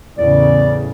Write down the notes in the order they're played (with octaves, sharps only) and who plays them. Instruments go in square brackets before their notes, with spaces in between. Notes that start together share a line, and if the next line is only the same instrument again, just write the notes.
[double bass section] E2 A2 C#3 [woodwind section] D5